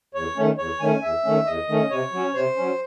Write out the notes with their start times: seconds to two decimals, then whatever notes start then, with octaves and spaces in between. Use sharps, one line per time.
0.14 E2 C#5
0.36 D#3 A3 C#4
0.58 E2 C#5
0.80 D#3 A3 C#4 G#5
1.02 E2 E5
1.24 D#3 A3 C#4
1.46 E2 D#5
1.68 D#3 A3 C#4
1.90 C3 C#5
2.13 F#3 C#4
2.34 C3 C5
2.57 F#3 C#4